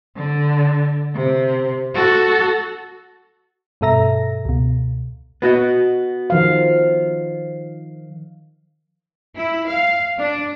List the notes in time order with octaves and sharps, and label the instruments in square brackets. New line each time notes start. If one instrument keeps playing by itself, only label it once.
[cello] D3
C3
F#4 A4
[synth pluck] G2 B2 A4 E5 A#5 A#6
C#2 B2
[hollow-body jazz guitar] B3 F#4 D#5
[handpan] D#3 F3 F5
[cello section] E4
F5
D4